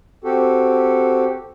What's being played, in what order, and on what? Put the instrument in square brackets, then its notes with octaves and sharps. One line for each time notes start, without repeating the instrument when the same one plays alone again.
[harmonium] C4 F#4 G4 A4